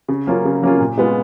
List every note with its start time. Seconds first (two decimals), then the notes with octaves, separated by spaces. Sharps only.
0.08 C#3
0.27 F#3 A#3 C#4 F4
0.45 C#3
0.62 F#3 A#3 C#4 F4
0.80 A#2
0.98 G#3 B3 F4